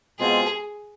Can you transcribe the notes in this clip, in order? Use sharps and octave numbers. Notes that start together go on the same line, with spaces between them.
B2 G#3 C4 F4 G#4